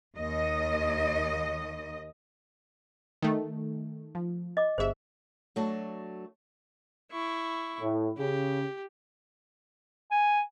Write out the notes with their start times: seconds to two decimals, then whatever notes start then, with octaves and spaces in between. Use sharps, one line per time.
0.16 D#2 D#5
3.22 D#3 A3
4.15 F3
4.57 D#5 D6
4.78 G1 G#4 C5 E5
5.56 F#3 A3 D4 F#4 A4
7.11 E4 C#6
7.81 A2
8.18 C#3 G4
10.11 G#5